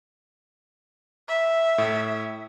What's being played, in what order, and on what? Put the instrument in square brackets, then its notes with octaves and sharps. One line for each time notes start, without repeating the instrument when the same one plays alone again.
[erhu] E5
[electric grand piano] A2